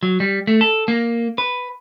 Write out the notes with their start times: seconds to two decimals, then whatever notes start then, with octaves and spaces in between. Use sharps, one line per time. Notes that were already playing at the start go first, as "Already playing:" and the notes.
0.03 F#3
0.20 G3
0.47 A3
0.61 A4
0.88 A#3
1.38 B4